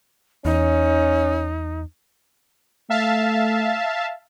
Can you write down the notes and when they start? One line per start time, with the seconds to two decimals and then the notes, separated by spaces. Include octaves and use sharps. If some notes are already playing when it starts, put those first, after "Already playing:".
0.45 E2 C#4 D#4
2.90 A3 E5 F5 A5